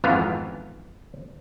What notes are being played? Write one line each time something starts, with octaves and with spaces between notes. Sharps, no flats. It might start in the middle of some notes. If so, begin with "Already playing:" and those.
G#1 F2 G#2 E3 B3 F5